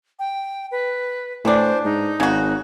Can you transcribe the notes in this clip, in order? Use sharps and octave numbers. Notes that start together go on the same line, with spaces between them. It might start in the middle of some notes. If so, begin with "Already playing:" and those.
G5
B4
A2 E3 D4 C5
G#2 D#4
G#1 C#3 F#4